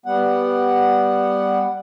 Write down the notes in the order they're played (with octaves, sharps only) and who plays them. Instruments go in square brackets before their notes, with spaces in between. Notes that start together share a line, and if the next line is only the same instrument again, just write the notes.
[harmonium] G3 B3 F#5